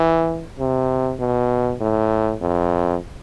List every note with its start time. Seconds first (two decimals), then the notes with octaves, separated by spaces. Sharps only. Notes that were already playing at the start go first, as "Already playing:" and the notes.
Already playing: E3
0.59 C3
1.19 B2
1.80 A2
2.42 F2